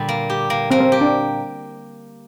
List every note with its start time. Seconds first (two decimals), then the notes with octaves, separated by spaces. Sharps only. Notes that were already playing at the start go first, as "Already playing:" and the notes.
Already playing: A#2 D3 G3
0.09 A#3
0.30 G4
0.50 A#3
0.71 A#3 C4
0.81 C4
0.92 G4
1.01 D4